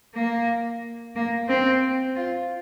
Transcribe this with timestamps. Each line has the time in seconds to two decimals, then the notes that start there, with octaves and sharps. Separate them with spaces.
0.15 A#3
1.15 A#3
1.49 C4
2.16 F4